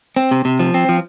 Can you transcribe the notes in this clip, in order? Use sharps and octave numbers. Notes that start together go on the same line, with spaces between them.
C4
C3
C3
F3
C4
F3